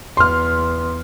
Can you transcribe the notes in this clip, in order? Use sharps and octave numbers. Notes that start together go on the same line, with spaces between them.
E2 B3 C6 F6